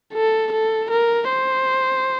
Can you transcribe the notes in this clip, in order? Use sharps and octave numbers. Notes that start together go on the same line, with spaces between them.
A4
A4
A#4
C5